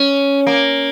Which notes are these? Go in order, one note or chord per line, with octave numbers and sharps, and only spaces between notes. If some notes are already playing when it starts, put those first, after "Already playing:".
Already playing: C#4
A#3